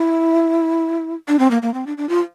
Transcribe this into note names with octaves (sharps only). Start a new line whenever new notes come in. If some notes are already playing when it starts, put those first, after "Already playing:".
Already playing: E4
D4
C4
A#3
A#3
C4
D4
D4
F4